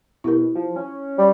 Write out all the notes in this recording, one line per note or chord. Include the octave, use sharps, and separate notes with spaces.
B2 E4 G4 A#4
F3
C#4
G3